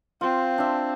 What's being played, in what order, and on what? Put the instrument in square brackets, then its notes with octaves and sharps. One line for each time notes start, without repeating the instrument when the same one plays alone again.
[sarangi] C4 [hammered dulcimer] F4
[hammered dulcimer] D4 E5